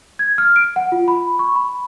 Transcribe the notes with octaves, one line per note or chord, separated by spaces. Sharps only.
G#6
F6
D7
F#5
F4
B5
C#6
B5